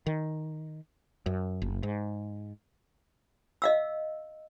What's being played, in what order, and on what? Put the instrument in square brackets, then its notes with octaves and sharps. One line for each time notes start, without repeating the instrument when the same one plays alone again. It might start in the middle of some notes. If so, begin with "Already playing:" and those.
[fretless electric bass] D#3
F#2
F#1
G#2
[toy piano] D#5 F5 E6